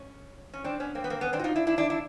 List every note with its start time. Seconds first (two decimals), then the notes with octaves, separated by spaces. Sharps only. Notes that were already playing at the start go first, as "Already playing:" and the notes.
Already playing: C#4
0.54 C#4
0.64 C4 D4
0.80 B3 C#4
0.95 A#3 C4
1.04 B3
1.10 A#3 C4
1.21 B3 C#4
1.33 C4 D4
1.39 F#4
1.44 D#4 F4
1.56 D4 E4
1.67 D4 E4
1.78 D4 E4
1.90 D4 E4